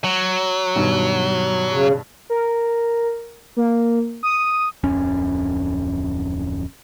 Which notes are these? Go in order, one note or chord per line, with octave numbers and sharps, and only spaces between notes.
F#3
G2 B2 D#3
C#3
A#4
A#3
D#6
D1 F2 C#4